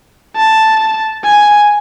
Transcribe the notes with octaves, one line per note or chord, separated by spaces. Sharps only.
A5
G#5